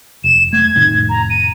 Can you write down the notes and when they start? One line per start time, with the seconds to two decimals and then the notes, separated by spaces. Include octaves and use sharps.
0.24 F1 E7
0.53 A3 G#6
0.75 F1 A2 D#3
1.09 A#5
1.30 D#7